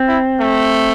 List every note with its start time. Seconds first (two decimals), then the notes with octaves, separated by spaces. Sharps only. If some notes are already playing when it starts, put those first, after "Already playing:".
Already playing: C4
0.08 E4
0.40 A3